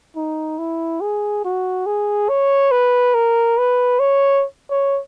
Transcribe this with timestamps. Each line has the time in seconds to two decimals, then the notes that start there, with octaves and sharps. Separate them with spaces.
0.16 D#4
0.59 E4
1.01 G#4
1.45 F#4
1.86 G#4
2.29 C#5
2.71 B4
3.14 A#4
3.58 B4
4.00 C#5
4.71 C#5